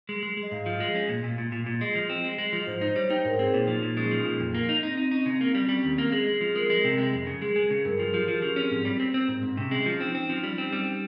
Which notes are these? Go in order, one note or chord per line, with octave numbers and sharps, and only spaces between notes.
G#3
G#3
G#3
D#5
G#2 F5
F3
G#3
C#4
A#2
A#2
A#2
A#2
A#2
G#3 D#5
F3
C4
G#3
G#3
F3
G#2 C5
D#4 C5
G3 C#5
D#4 G5
G#2 A#4
C4 G#4
A#2 D#4
F3
A#2
G#3 C#4
F3
A#2
F2
A#3
D#4
C4 D#4
C4 D#4
C#4 D#4
C#3 C4
A#3
G3
G3 C#4
D#2
A#3
G#3 G#4
G#3
F3
G#3 A#4
G#3
C3
G#3
F2
C#3
G#3 G#4
G#3
C#3
G2 A#4
F3 G#4
F3 G4
F3 F4
F3 C#4
C4 C#4
G#2 C4
G3
C4
C4
G#2
G#2
C3 C#4
G#3
F3
C4 D#4
C4
F3
G3
C4
G3